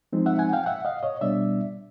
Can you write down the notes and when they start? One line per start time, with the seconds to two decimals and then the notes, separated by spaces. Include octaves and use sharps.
0.13 F3 G#3 C4 D#4
0.26 E5 F#5
0.39 F#5 G#5
0.53 F5 G5
0.66 E5 F#5
0.85 D#5 F5
1.03 C#5 D#5
1.21 B2 G3 B3 D4 D5 E5